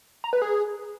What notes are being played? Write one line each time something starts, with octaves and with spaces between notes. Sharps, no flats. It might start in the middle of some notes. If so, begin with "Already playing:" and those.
A#5
B4
G#4